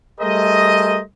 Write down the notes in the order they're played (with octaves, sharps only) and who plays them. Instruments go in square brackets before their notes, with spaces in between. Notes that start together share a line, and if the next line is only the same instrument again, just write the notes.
[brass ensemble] G3 A3 G#4 A#4 C5 D#5